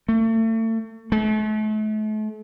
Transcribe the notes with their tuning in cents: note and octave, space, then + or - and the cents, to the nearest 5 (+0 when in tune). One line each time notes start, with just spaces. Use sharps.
A3 +35
A3 -40